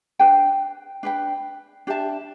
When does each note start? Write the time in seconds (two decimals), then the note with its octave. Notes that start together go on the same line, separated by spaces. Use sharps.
0.19 D4 B4 G5
1.03 D4 B4 G5
1.87 D4 G4 E5 A5